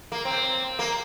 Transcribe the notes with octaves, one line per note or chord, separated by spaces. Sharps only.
A#3
C4
A#3